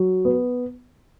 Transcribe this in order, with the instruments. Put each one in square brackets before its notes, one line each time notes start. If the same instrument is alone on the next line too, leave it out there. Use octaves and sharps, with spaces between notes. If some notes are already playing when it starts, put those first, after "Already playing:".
Already playing: [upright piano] F#3
B3